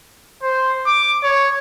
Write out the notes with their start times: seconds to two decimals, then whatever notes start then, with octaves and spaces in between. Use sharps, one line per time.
0.43 C5
0.86 D6
1.24 C#5